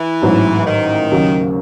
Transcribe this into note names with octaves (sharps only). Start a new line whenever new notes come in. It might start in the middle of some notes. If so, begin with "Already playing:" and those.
Already playing: E3
A1 G#2 F#3
D#3
D#2 C#3 F#3